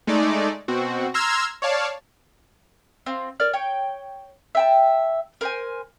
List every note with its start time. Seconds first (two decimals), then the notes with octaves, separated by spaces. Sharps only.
0.07 G#3 A3 D#4 D5
0.68 B2 C4 F#4
1.14 A#5 C6 E6 F6 G#6
1.62 C#5 D5 F5 A5
3.06 C4 F4
3.40 A#4 D5 F6
3.53 C#5 G5
4.55 E5 G5 A5
5.41 A#4 C5 G#5